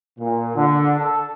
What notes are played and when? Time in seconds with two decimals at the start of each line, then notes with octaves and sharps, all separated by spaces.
0.19 A#2
0.56 D3
0.99 A4